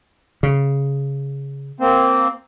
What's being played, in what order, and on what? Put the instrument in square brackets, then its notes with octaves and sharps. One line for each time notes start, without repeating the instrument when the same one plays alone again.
[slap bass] C#3
[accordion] A#3 C4